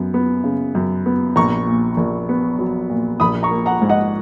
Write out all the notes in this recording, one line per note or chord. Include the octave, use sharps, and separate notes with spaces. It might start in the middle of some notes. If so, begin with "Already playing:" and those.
Already playing: F#2 B3
B3
C#3
F#2
B3
A#1 A#5 C#6
A#2
A#1
B3
F#3
A#2
A#1 B5 D#6
A#5 C#6
A#3
F#5 A#5
G#2
D#5 F#5